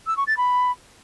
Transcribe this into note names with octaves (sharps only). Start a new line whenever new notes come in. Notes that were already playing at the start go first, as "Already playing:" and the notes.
E6
C#6
A6
B5